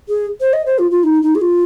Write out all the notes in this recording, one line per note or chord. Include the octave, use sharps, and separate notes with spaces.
G#4
C5
D#5
C5
F4
F4
D#4
D#4
G#4
F4